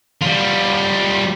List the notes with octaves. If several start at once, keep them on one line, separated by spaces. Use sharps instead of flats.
G3 F4